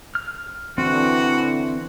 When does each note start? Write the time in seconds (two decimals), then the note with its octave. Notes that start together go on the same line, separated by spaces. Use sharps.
0.15 F6
0.78 D3 E3 C4 F#4